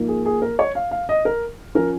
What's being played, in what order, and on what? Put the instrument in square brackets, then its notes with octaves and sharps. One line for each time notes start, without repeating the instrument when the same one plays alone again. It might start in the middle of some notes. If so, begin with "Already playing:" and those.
Already playing: [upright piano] G#2 F3 A#3
G#4
G#4
A#4
C#5
F5
F5
D#5
A#4
F3 C#4 A#4